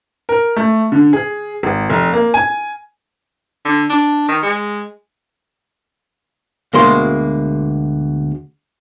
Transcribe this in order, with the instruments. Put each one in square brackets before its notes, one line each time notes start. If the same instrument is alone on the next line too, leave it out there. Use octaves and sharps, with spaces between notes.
[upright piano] A#4
A3
D3
G#4
G#1
F1
A#3
G#5
[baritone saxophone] D3
D4
D#3
G#3
[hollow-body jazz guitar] D2 B2 G#3 A#3 C6